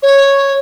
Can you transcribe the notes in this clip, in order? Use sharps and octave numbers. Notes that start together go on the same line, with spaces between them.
C#5